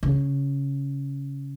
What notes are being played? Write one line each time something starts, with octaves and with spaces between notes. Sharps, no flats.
C#3